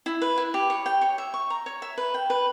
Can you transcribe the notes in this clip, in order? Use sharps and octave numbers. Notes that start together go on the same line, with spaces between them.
E4
B4
E4
G4
C#5
G5
C#5
E5
C#6
A#5
C#5
E5
B4
G5
B4